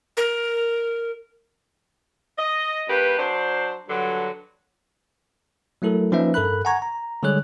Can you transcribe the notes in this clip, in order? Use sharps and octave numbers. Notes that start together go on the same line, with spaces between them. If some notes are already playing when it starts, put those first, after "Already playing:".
A#4
D#5
G2 A#3 G4 B4
F#3 D4 C5
G2 D3 F#3
F#3 A3 E4 A4 A#4
F3 A#3 C#4 D#4 B4 E5
G2 A4 A#4 B5 F#6
F#5 G#5 A#5 C#6 G#6
A#5
D3 G3 G#3 G#4 C#5 F#6